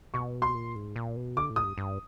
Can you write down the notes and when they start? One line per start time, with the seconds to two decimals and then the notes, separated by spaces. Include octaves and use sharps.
0.14 B2 C#6
0.42 C6
0.55 A#2
0.76 G#2
0.96 A#2
1.16 B2
1.37 D3 D6
1.50 A2
1.56 D#6
1.64 G2
1.78 G2